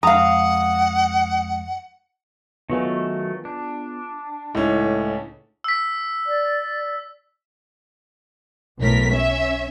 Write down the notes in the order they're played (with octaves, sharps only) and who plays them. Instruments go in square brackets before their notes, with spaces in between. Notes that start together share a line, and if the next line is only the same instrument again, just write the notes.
[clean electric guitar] F2 G#3 G#4 [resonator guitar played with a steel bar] F5 A#5 [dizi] F#5 [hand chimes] D#6
[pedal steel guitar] D#3 F#3 A3 [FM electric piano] B3 F4 G#4
[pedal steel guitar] D4
[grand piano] C#2 C#4 [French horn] A2 [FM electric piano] D#4 E4
[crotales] E6 B6
[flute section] D5
[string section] B1 A2 A#4 B6
C#4 E5